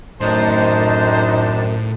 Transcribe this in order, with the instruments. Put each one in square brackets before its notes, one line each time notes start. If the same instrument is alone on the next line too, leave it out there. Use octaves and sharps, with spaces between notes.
[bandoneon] F#2 [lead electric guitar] A2 [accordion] D#3 D4 A5 [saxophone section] D#4 C5